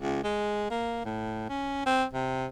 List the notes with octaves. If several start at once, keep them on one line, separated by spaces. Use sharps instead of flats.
C#2
G#3
A#3
A2
C#4
C4
C3